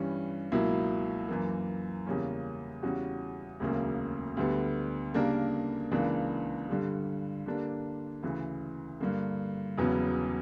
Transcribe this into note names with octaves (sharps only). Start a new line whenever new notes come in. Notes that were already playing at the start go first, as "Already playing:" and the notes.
Already playing: G2 E3 G3 C#4
C#2 B2 F#3 A#3 E4
F#2 E3 A#3
E2 C#3 G3 A#3 C#4
E2 C#3 G3 C#4 F#4
E1 D2 C#3 F#3 A#3
D2 D3 G3 B3
C#3 G3 A#3 D4 A#4
C#2 C#3 E3 A#3 D4
G2 D3 G3
D3 G3 A#3 D4
D2 C#3 E3
G2 D3 A#3
E1 E2 C#3 F#3 B3